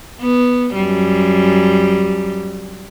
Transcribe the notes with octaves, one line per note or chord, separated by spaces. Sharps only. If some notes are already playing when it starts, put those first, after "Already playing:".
B3
F#2 G3